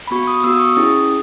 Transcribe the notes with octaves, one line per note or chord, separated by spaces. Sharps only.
B5
B3 F#4 C#6
D#6
B3 F#4 E6
D#6
C#6
C#4 E4 G#4 D#6